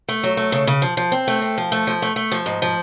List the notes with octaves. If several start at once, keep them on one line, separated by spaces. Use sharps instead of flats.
A3
F#3
A3
C#3
C#3
F3
F3
C4
A3
C4
F3
A3
F3
A3
A3
F3
G#2
F3